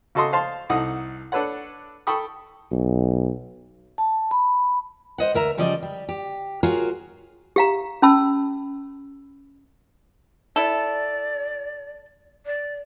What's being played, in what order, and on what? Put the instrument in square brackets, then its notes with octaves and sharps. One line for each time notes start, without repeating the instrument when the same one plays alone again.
[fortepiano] C#3 F#4 A4 D#5 C6 D#6
C5 F5 A5 C6
C2 D#4 A4 F#5 D#6
D4 A4 B4 C#5 F#5
A4 G5 B5 C#6 D#6
[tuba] B1
[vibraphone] A5
B5
[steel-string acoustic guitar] C5 D#5 F#5
D2 A#4 E5 A#5
C#3 F3 G3 C#4 D5 D#5
G3
G4
F4 F#4 G#4 A#4 C#5 F5
[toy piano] G4 F5 A#5
C#4 A5 B5 E6
[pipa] E4 A4 [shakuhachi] D5
[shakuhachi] D5